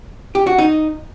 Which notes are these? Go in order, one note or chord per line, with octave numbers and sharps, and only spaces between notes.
G4
F#4
D#4